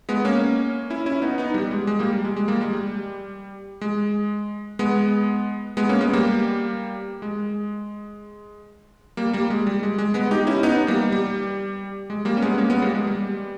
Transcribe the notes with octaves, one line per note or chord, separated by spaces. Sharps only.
G#3 B3
A#3 C#4
C#4 E4
C#4 E4
B3 D#4
B3 D#4
G3
G#3
G#3
G3 A#3
G3
G#3
G#3
G3 A#3
G#3
G3
G#3
G#3 B3
G#3 B3
A#3 C#4
G#3 B3
G3 A#3
G#3
G3 A#3
G3 A#3
G#3
G3
G#3
G#3
G#3 B3
D#4 G4
C#4 E4
B3 D#4
G3 A#3
G3
G#3
G3 A#3
C#4
G#3 B3
A#3 C#4
G#3 B3
G3 A#3
G#3
G3